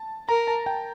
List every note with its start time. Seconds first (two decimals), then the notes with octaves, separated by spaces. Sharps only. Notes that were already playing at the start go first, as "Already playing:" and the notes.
Already playing: A5
0.28 A#4 A#5
0.47 A5
0.66 G5